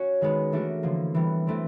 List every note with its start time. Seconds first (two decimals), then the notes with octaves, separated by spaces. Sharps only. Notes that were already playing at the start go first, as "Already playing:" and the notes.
Already playing: C#4 F#4
0.21 D#3 G#3 B3
0.52 E3 A3 D4 F#4 A#4
0.83 D3 F3 A#3
1.15 E3 G3 B3
1.47 E3 A3 C4